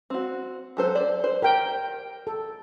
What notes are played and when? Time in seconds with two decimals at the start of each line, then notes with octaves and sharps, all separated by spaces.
0.10 C4 F#4
0.77 F#3 A4 C5
0.95 C5 D5
1.24 C5
1.42 G4 A#4 G5
2.27 A4